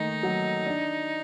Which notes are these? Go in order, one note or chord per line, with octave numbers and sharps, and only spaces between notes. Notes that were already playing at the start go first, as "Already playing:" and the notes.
Already playing: D#3 A3 D#4
F#3
D4